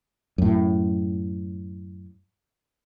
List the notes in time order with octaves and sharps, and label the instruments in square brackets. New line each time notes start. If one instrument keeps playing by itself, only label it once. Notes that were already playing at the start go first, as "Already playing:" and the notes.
[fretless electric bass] F#2 A2